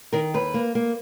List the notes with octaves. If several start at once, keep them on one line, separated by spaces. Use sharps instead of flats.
D#3 A#4
D#2 B4
A#3
A#3